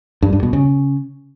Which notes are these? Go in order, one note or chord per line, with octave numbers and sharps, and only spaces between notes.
G2
G2
B2
C#3